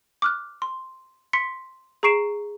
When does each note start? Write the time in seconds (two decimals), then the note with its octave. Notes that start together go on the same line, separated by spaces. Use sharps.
0.22 D6 F6 F#6
0.62 C6
1.33 C6 B6 C#7
2.03 G#4 A#5 C#6 C7 D7 E7